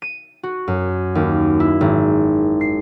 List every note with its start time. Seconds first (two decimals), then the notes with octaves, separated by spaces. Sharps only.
0.02 D#7
0.43 F#4
0.68 F#2
1.15 D#2
1.60 E4
1.81 G#1
2.61 C7